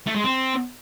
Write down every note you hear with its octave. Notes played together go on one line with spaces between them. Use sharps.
A3
G#3
C4